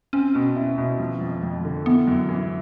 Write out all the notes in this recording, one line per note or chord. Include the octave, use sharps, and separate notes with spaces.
C4 C#4
B2
E4
B2
F3
F2
F2
D3
E3 B3
F#2
E3